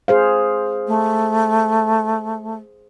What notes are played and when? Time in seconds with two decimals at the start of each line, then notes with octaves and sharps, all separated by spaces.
0.08 G#4 C5 F5
0.88 A3